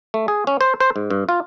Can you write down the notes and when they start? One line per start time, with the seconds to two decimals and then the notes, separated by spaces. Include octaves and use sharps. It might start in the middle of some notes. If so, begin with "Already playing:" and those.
0.14 A3
0.28 G#4
0.47 C#4
0.61 C5
0.80 C5
0.96 G#2
1.10 G2
1.29 F4